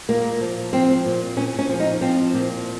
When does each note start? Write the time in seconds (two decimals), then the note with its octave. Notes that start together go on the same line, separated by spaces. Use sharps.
0.08 A#2 A#3
0.41 F3
0.73 F3 C4
1.05 A#2
1.37 A#2 C#4
1.59 C#4
1.69 F3
1.80 D#4
2.01 F3 C4
2.34 A#2